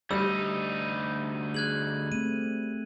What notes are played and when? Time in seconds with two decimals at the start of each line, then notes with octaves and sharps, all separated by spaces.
0.11 D2 G3 D#4 E6
1.54 G#4 F#6 G#6 F#7
2.12 A3 C4 D#7